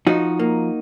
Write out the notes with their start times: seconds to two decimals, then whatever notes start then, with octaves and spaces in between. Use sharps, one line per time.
0.07 F3 D#4 F#4
0.39 A#3